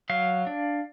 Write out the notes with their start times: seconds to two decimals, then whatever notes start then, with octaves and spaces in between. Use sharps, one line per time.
0.10 F#3 F5
0.47 D4